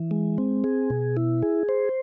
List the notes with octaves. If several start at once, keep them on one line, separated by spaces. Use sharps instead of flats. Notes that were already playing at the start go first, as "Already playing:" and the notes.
Already playing: E3
G#3
C4
G#4
B2
E4
G#4
C5